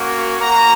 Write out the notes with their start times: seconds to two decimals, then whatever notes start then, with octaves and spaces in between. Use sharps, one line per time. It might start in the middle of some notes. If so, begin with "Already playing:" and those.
Already playing: A#3 C#4 F#4
0.40 A#3 F#4 A#5